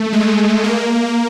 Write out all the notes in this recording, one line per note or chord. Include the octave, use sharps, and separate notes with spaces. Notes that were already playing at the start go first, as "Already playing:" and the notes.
Already playing: A3
G#3
A#3